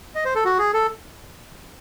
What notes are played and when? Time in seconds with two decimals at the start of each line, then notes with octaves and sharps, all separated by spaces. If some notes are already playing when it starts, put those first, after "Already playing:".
0.15 D#5
0.25 C5
0.35 A4
0.45 F#4
0.58 G#4
0.74 A4